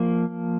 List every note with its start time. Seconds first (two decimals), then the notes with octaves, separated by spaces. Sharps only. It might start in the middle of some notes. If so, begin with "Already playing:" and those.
Already playing: F3 A#3